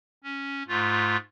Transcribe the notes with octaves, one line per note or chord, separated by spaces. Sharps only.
C#4
G#2 A3 F4